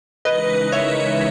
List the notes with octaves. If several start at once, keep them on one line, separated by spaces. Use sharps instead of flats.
C#3 E3 G#3 D#4 A#4 B4 D#5
C#5 E5